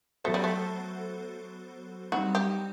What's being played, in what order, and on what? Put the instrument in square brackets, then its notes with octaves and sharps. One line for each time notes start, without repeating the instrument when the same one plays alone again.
[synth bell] F#3 B3 F#4 A4 C5 [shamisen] A3
[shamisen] G3
A3
[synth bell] G3 C4 D#4 [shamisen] F#4
[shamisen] G4